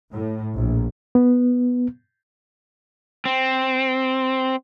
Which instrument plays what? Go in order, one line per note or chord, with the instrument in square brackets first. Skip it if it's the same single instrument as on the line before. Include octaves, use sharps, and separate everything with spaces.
[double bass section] A2
A#1
[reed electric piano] B3
[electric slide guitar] C4